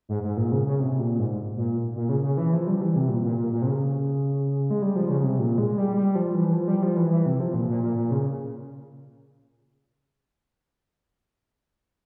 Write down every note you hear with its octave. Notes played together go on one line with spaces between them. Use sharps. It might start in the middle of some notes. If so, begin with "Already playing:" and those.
G#2
G#2
A#2
C#3
C#3
C3
A#2
G#2
A#2
A#2
C#3
C#3
E3
F3
G3
E3
C3
A#2
A#2
A#2
A#2
C3
C#3
G#3
G3
F3
C#3
C3
A#2
G#3
G3
G3
F3
E3
F3
G3
F3
E3
E3
C3
F3
A#2
A#2
A#2
A#2
C#3